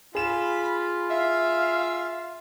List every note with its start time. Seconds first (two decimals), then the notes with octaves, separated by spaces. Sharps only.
0.15 F4 G#4 B5 E7
1.10 E5 F5